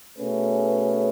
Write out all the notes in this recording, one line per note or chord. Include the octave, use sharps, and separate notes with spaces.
B2 A3 C#4 G#4 B4